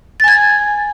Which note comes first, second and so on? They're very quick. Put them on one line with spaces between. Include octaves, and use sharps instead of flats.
A6 G#5 G#6